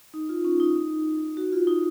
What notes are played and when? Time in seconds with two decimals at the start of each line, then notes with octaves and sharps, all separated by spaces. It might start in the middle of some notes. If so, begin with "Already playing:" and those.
0.14 D#4
0.29 F4
0.45 C#4
0.60 D#4
1.37 F#4
1.52 F4
1.67 D#4